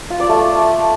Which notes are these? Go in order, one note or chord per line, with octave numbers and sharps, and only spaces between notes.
F4
D5
A3